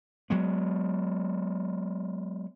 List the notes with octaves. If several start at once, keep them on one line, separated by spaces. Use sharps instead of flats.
F#3 G#3 B3